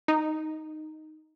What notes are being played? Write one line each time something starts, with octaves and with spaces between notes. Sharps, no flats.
D#4